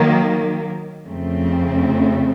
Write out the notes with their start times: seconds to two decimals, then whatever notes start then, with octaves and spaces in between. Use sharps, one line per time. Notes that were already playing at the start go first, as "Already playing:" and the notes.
Already playing: D#3 F#3 A#3
1.07 F2 C#3 A3 C4